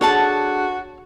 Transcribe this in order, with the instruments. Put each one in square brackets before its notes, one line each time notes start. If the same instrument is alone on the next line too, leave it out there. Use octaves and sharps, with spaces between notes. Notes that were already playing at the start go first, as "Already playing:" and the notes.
[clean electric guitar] D4 G#4 A4 [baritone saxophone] F#4 [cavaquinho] C#5 F#5 A5